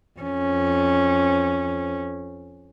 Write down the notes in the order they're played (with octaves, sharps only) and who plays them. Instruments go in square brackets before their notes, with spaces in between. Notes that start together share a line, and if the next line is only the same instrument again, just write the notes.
[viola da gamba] F2 C#4